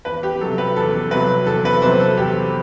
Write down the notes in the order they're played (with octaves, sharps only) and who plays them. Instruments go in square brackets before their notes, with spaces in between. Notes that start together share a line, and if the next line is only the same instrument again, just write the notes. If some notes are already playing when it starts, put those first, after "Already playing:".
[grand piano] E2 B4
G4
C3 F#3 A4
B4
E2 A4
C3 F#3 B4
E2 A4
B4
C3 C5
F#3
A4
E2 G4